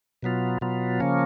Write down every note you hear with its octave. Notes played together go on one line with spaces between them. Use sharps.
B2 F#3 B3 F4
B2 F#3 B3 F4
C#3 F3 A#3 C#4